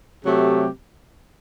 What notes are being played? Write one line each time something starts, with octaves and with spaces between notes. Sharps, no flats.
C3 F#3 A3 G4